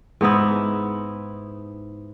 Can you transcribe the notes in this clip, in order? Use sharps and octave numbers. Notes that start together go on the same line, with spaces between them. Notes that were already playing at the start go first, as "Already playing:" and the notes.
G#2 B3 D#4 E4